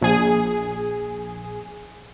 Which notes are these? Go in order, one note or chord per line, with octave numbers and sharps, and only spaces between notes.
A#1 G#4